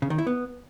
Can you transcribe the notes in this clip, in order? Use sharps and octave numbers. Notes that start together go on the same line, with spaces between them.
C#3
D#3
E4
B3